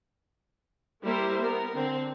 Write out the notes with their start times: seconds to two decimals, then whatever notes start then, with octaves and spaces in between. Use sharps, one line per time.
1.03 G3 A#3 E4 A#4 C5
1.41 B3 A#4
1.75 D3 C4